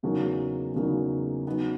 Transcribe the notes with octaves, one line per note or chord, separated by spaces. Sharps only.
E2 C#3 F#3 A#3 D#4
E2 C#3 F#3 A#3 D#4
F#3 B3 D#4